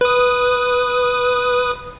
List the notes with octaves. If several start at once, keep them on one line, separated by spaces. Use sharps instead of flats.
B4 D#6